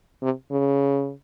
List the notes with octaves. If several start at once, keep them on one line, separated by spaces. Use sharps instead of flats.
C3
C#3